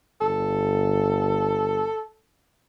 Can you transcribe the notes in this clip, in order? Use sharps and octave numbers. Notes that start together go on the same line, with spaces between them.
G1 A4